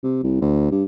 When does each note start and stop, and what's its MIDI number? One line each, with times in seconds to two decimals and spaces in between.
0.04 0.21 48
0.24 0.37 36
0.41 0.70 38
0.71 0.84 43